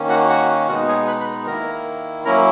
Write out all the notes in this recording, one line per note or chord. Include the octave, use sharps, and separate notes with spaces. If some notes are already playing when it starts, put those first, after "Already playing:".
Already playing: D#3 A#3 C#4
F#4 F#5
F#4 F#5
B2 G#3 B3 D#4 F#4 F#5
G#4 G#5
B4 B5
B4 B5
D#3 A#3 E4 A#4 A#5
F#3 A#3 C#4 E4 A#4 A#5